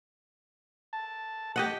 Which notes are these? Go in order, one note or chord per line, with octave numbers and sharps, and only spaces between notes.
A5
G4 D#5 F#5